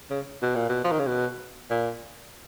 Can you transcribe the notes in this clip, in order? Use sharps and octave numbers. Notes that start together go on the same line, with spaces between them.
C#3
B2
A#2
B2
F3
D#3
C#3
B2
A#2